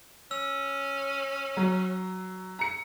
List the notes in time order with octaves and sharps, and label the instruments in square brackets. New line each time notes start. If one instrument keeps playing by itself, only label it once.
[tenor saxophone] C#4 [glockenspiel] E6
[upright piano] F#3
A#5 C#7